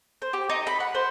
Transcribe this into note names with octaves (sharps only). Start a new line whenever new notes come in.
C5
G4
D#4
B5
F#5
C5